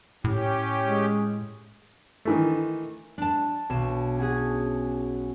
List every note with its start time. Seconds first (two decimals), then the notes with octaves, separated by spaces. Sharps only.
0.24 A2 C#4 G4
0.83 G#3
2.25 D#3 E3 A3
3.18 D4 A5
3.70 B1 C#6 E7
4.19 C#4 F#4 G#4